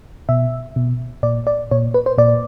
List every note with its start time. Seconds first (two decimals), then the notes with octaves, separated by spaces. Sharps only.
0.29 B2 E5
0.76 B2
1.23 A#2 D5
1.47 D5
1.71 A#2 C#5
1.94 B4
2.06 C5
2.18 A#2 D5